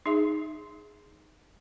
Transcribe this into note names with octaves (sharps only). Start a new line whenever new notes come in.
D#4 G#4 E5